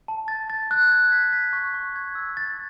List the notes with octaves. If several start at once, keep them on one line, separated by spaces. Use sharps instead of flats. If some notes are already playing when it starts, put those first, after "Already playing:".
A5
A6
A6
F#6
G#6
B6
B6
C#6
C#6
G#6
E6
A6